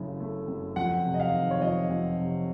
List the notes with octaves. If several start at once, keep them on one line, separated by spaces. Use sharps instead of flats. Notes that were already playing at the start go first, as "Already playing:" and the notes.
Already playing: F#1 F#2 C#3 A3
A3
F#2
F2 F#5
C3
D#5
F5
D#3
C#5
F2 D#5
F2
C3